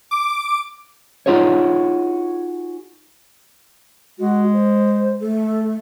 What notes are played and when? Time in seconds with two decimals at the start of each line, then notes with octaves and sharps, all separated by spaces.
0.11 D6
1.26 D#4 F4 F#4 G#4 C#5
4.19 G#3 F#4
4.53 C5
5.21 A3 A4